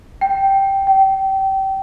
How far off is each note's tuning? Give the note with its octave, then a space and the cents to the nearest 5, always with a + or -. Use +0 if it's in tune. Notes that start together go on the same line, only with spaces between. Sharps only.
G5 -5
G5 -25